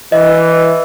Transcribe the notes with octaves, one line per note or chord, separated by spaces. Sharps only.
E3 D#5